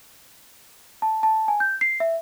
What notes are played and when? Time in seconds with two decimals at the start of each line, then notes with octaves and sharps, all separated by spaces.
1.02 A5
1.23 A5
1.48 G#5
1.60 G6
1.81 C7
2.00 E5